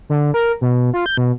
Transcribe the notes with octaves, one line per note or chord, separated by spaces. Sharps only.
D3
A#4
B2
F4
G6
B2